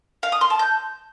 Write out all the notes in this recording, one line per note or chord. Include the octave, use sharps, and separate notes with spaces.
F5
D#6
C6
A5
G6